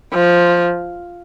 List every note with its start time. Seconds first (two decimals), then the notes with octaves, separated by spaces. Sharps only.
0.14 F3